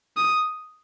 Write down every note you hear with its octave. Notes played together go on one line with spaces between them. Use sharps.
D#6